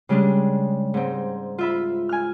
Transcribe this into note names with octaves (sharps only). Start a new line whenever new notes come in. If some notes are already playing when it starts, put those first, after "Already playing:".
C#3 G3 G#3 D4
G#2 C4
F4 E5 B5
G#5 F6